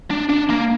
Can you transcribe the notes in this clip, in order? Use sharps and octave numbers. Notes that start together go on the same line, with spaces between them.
D4
D4
A#3